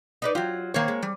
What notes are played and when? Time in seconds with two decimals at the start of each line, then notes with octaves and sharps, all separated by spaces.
0.22 D#4 B4 D5
0.35 F#3 F4 G4
0.74 D#3 A#3 C4 C#5
0.88 G#3
1.03 G3